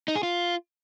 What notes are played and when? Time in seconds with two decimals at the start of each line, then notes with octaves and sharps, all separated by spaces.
0.08 D#4
0.16 G#4
0.23 F4